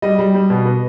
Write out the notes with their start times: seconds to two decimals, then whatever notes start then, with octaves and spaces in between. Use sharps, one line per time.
0.02 G3 D#5
0.19 G3
0.34 G3
0.50 B2
0.65 B3